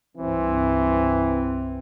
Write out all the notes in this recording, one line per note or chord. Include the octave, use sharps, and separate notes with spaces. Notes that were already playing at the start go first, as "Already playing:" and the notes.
C2 G2 E3 C4